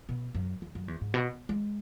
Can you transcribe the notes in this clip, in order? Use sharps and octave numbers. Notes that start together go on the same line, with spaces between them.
B2
F#2
E2
F#2
E2
G#2
B2
G#3